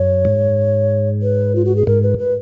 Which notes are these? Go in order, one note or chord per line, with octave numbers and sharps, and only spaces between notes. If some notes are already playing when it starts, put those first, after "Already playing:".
Already playing: F#2 C#5
G#2
B4
F4
F#4
G#4
G#2 A#4
B4
B4